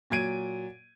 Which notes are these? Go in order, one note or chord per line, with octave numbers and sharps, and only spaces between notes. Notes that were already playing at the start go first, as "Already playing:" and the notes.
A#2 F#3 G#6 D7 D#7